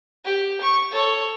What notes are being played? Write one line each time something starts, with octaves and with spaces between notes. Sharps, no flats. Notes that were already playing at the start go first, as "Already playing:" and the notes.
G4
C#6
A4 C#5